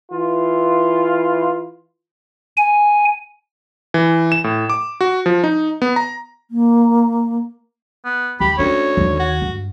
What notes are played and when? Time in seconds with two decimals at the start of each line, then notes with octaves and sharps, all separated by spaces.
0.11 E3 F4
2.57 G#5
3.94 E3
4.32 E7
4.44 A2
4.70 D6
5.01 F#4
5.26 F3
5.44 D#4
5.82 B3
5.96 A#5
6.51 A#3
8.05 B3
8.40 D#2 G4 B5
8.59 D2 C#4 C#5
8.97 D#2 D#3
9.20 F#4
9.42 G2